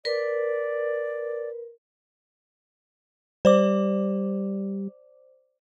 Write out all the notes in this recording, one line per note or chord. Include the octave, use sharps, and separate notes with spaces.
A#4 B4 D5
G3 C5 D5 D6